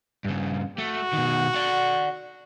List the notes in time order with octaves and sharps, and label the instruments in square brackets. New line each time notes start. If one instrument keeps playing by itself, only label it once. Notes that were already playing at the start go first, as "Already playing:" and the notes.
[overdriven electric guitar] G2 C#3
[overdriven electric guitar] A3 [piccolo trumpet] F#4
[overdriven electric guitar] B2 D#3
D5 F#5